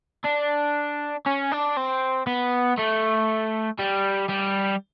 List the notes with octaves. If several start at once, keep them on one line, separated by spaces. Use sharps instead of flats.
D4
C#4
D4
C4
B3
A3
G3
G3